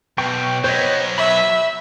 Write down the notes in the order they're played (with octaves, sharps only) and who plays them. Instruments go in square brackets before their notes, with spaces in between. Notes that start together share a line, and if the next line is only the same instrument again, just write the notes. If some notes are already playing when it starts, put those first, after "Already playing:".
[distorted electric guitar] B1 [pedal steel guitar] G5 C#6
[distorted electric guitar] F#3 B3 [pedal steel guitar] C5 C#5 D#5
[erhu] E5 [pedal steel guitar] B5